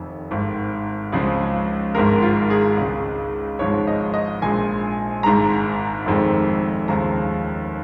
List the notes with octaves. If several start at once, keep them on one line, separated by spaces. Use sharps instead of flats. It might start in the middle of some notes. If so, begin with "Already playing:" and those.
Already playing: F1 F2 D#3
G#1 G#2 D#3
C#2 C#3 F3 G#3
G#1 G#2 D#3 G#3 A#4
F4
G#4
C#2 C#3 G#3
G#1 G#2 F3 G#3 C#5
D#5
D#5
A#1 A#2 G#3 G#5
G#1 G#2 G#3 A#5
F1 F2 D#3 G#3
D#2 C#3 F3 G#3 A#5